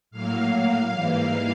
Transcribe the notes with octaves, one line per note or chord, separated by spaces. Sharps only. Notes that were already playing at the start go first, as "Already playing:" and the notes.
A2 F#3 A#3 F5
G#2 E3 G3 A#3